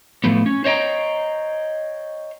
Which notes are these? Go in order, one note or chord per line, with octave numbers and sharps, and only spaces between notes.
A2 F3 A3 B3
C#4
C5 C#5 D#5 G5 A#5